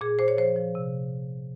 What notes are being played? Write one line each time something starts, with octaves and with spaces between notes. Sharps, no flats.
A#2 G#4
A#2 C5
C#5
F3 C5
F3
C3